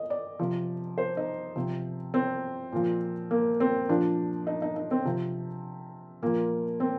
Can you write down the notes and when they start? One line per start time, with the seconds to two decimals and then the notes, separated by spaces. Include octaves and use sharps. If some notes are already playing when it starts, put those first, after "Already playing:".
Already playing: D#5
0.10 D5
0.39 C3 F3
0.98 C5
1.17 D#4
1.56 C3 F3
2.14 C4
2.72 A#2 F3
3.31 A#3
3.60 C4
3.88 A#2 F3 D4
4.47 D#4
4.62 D#4
4.76 D#4
4.91 C4
5.05 C3 F3
6.22 A#2 F3 A#3
6.80 C4